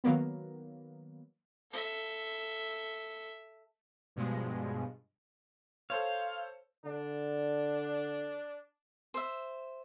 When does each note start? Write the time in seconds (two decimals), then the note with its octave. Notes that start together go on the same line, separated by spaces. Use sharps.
0.04 D#3 F#3 A#3 B3
1.71 A4 E5
4.16 G2 B2 F3 G#3
5.90 A4 C5 C#5 F5
6.85 D3 D4
9.14 C5 E5